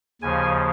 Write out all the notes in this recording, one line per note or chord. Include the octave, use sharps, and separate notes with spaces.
D#2 C#3 F3 G#5